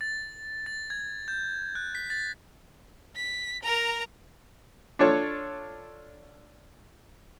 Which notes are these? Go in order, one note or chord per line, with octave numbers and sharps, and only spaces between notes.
A6
A6
G#6
G6
F#6
B6
A6
B6
A#4 A#5
D4 F4 A4 C#5